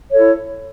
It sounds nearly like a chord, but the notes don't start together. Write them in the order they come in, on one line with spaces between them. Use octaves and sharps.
C#5 A4 E4